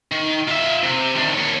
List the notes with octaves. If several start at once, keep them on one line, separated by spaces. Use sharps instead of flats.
D#3
F4 E5
C3
D#3 D4
A#3 C#5